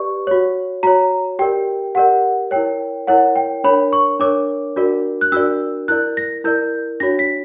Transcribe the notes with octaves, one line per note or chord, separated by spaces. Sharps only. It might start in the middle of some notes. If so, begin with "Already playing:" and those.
Already playing: G4 B4 D5 C#6
F#4 C#5
F#4 C#5 A#5
G4 A#4 D5 G5
G4 A#4 D5 F#5
E4 A#4 C#5 G5
E4 A#4 C#5 F#5
G5
D4 A#4 C#5 B5
C#6
D4 A#4 C#5 D6
D4 F#4 A#4 D5
F#6
D4 F#4 A#4 D5 E6
E4 A#4 D5 F#6
A#6
E4 A#4 D5 G6
D4 F#4 C#5 A#6
B6